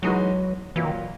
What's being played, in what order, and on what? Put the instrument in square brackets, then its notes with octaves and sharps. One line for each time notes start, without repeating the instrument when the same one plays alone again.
[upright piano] E3 G#3 D#4 F#4 B4 [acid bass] F#3
[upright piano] A#2 F#3 A#3 [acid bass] E3
[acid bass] D#3